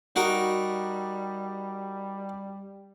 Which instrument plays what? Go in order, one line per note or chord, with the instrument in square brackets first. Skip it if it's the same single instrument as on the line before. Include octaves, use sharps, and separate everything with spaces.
[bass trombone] G3 [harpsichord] D#4 F#4 A#4